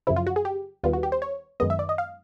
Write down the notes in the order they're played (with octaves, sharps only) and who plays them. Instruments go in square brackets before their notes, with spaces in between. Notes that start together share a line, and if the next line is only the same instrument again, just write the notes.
[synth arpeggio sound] F#2 C#3 F3 E4
F4
F#4
G#4
G4
D#2 D#3 G3 B3 F4
F#4
G4
C5
C#5
F#2 D#3 G#3 B3 D#5
E5
D5
D#5
F5